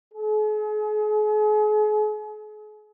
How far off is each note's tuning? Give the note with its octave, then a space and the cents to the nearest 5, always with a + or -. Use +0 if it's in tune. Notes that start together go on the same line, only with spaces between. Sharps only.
G#4 +40